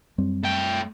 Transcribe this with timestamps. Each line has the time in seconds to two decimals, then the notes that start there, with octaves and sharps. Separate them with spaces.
0.18 F#2 G3 C4
0.44 A3 G5